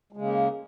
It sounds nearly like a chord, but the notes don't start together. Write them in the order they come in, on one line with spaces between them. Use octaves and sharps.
G#3 C#3 A#3